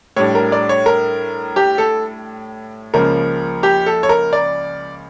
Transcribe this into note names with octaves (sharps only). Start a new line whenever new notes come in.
A2 G3 D4 C#5
A#4
D5
C#5
A#4
G4
A4
C#2 C#3 F3 A#3 A#4
G4
A4
C#5
A#4
D5